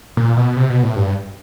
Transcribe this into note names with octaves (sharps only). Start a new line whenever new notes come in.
A#2
B2
C3
B2
A2
G2